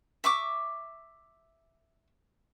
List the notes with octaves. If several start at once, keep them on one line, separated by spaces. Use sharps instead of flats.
E5 C#6 D6